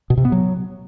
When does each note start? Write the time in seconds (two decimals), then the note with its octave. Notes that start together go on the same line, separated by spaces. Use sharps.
0.10 B2
0.17 C3
0.25 B3
0.32 F#3